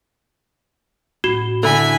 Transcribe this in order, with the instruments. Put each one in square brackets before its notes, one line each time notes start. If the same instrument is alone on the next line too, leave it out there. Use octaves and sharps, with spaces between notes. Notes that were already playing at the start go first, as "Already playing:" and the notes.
[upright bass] A1 [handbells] F#4
[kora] D3 E4 [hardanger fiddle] G#5 B5